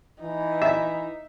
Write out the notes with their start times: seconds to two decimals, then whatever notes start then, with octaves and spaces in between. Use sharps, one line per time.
0.22 E3 D#4
0.62 E5